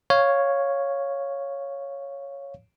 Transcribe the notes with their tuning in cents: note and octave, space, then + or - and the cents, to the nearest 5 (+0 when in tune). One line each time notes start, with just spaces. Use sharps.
C#5 +0 F5 +0